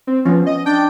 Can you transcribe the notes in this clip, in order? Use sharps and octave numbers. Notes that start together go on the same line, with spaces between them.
C4
F3 B3 C#4
D#5
D4 G5